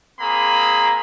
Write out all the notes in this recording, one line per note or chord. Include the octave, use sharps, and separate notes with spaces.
A#3 C4 G#4 A#5 B5